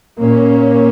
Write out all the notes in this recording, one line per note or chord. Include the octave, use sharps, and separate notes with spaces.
A#2 A#3 C#4